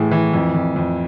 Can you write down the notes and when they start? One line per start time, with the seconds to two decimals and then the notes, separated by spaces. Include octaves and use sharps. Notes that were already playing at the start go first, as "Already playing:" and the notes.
Already playing: A2 E3 G#4
0.11 E3
0.33 F2
0.55 F2
0.76 F2